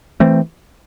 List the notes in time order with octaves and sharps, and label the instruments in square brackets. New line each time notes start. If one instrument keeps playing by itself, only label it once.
[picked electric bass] E3 A3 C4